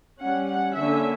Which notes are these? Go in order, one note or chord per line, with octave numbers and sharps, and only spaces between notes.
G3 C#4 F#5
F#5
D3 A#3 C#4 E5